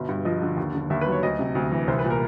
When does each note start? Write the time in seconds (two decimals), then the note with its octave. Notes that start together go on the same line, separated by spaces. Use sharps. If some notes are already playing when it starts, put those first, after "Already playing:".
Already playing: G1 B2
0.09 G2
0.25 F3 D#5
0.42 D3
0.57 D#2
0.75 D3
0.90 D#2 E5
1.01 B4
1.07 F#3
1.12 C#5
1.23 D2 D#5
1.39 C3
1.55 D2
1.72 E3
1.88 C2 C5
1.99 B4
2.04 A#2
2.10 A#4